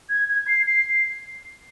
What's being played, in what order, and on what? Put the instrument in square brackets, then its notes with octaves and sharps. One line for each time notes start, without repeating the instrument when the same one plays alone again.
[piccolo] G#6
G#6
C7
C7